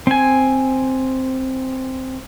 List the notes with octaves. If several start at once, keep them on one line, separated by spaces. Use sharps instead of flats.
C4 G#5